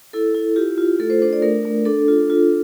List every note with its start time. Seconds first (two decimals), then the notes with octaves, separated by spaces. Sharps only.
0.13 E4 A4
0.34 E4
0.56 F4 G4
0.78 F4
0.99 A3 A4
1.10 C5
1.22 D4 C5
1.33 D5
1.42 A3 A#4
1.65 A3
1.85 D4 A4
2.08 F4
2.30 F4